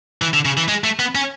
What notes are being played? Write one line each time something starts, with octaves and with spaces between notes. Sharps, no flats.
E3
D3
C#3
E3
G#3
A3
B3
C#4